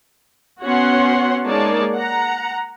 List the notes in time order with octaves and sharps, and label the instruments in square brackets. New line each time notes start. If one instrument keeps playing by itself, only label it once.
[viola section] B3 C#4 F#4 C#5 F#5 C6
G#3 A#3 D#4 C#5 D5 A5
F#5 A#5